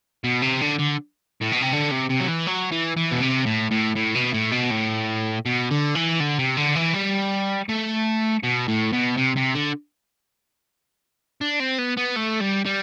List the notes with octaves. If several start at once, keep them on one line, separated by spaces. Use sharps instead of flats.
B2
C3
D3
D3
A2
B2
C3
D3
C3
C3
F#3
E3
F#3
E3
E3
B2
C3
A2
A2
A2
B2
A2
B2
A2
B2
D3
E3
D3
C3
D3
E3
G3
A3
B2
A2
B2
C3
C3
D3
D4
C4
B3
B3
A3
G3
G3